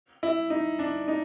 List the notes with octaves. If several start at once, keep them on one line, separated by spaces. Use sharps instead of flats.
E4
D#4
D4
D#4